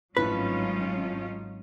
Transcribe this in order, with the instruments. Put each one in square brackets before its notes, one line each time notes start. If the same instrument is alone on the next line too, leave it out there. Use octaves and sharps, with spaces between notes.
[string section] G#1 F#3 [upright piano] A2 F3 [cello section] C#4 D#4 F4 [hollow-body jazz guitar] B4